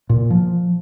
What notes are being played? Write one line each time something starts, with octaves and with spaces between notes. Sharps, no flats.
A#2
F3